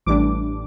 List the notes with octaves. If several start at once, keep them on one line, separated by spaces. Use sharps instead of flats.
A1 A2 E3 G3 D4 D6